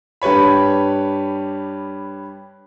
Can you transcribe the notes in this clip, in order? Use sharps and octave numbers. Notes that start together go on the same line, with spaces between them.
G2 G4 B4 C#5 B5